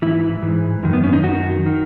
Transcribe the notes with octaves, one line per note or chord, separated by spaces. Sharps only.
G#2 E3 E4
G#2 E3
F#2 D#3
B3
C#4
D#4
F#2 D#3 F#4
D#3